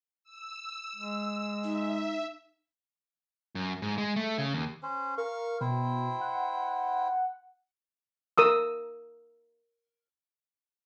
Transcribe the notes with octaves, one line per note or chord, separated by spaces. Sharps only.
E6
G#3
D#4 E5
F#2
G#2
G#3
A3
C#3
D#2
C#4 C5
A#4 F5 C#6
B2 E4 C5 G5
F#5
A#4 D#6 E6